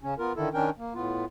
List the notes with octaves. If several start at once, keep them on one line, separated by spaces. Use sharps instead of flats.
C#3 C#4
B3 F4 A#4
D3 D#3 E4 A4
D#3 C#4 D4 A#4 G5
A#3
A2 B3 F4